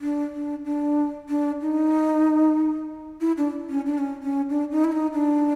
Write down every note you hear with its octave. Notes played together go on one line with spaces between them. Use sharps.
D4
D4
D4
D4
D#4
E4
D4
C#4
D4
C#4
C#4
D4
D#4
E4
D#4
D4